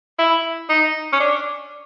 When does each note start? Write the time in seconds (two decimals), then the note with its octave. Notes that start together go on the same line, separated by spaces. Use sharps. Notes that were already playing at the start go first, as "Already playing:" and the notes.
0.19 E4
0.69 D#4
1.13 C#4
1.20 D4